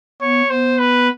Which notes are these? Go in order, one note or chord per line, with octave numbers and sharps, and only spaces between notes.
B3 C#5
B3 C5
B4